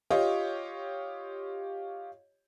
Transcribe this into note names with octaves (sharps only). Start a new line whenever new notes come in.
F4 G4 C#5 D#5